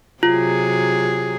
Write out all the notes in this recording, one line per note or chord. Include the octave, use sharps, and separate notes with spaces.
C3 F#3 F4 G#4